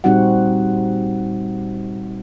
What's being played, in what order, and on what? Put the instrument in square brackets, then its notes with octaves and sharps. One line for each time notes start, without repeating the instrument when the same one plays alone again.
[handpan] A#2 G3 C4 D#4 F#4 F#5